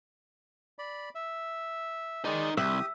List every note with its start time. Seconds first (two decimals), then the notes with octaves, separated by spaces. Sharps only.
0.79 D5 B5
1.15 E5
2.25 D#3 G#3 D#4 D5
2.57 C2 G4 E5 D#6